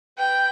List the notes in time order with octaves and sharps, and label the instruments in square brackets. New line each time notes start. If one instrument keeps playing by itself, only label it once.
[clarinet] B4 [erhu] G5